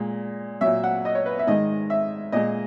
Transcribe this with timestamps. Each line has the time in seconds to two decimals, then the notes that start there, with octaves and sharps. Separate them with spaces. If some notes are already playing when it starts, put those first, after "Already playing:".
Already playing: A#2 G#3
0.61 A#2 F#3 E5
0.84 F#5
1.05 D#5
1.15 C#5
1.26 B4
1.39 E5
1.47 G#2 D#3 G#3 D#5
1.90 E5
2.32 A#2 G#3 D#5